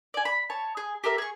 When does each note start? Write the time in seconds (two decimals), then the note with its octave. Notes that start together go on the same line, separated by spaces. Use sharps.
0.14 D5 G#5
0.25 B5
0.50 C#5 A5
0.77 G#4
1.04 G4 A4 A#4 E5
1.18 G#4 C#6